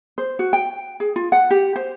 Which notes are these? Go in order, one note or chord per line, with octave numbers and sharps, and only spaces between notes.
C5
F#4
G5
G#4
F4
F#5
G4
C5